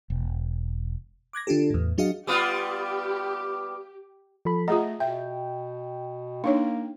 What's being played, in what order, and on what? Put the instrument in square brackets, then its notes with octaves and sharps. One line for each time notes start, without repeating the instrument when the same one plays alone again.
[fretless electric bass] E1
[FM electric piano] D6 F#6 G#6 A#6
D3 D4 F4 G4 A4
E2 A2
F#3 D4 F#4 G#4 D#5 F5
[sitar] G3 B3 F4 [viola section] G4
[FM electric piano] F3 A4 B5
[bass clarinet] A3 [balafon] F4 G#4 F#5 [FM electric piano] D#5 A#5
[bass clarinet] B2 [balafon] E5 [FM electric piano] G5
[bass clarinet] A#3 [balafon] D4 D#4 C#5